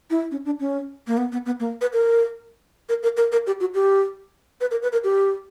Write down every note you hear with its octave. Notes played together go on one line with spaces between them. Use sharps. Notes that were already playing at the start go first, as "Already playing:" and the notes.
E4
C#4
D4
C#4
A#3
B3
B3
B3
A#3
B4
A#4
A#4
A#4
A#4
A#4
G4
F#4
G4
B4
A#4
B4
A#4
G4